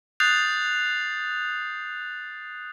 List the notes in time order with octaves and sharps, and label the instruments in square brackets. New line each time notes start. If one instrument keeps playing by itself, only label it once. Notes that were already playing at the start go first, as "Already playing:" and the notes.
[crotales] D#6 F#6 G6 A6 C7 F7